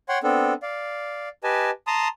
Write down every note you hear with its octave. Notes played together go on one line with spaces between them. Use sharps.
C#5 F#5 G5 C6
B3 C4 D4 A4
D5 F5
G4 B4 D#5 G#5 A5
A5 A#5 C6 D#6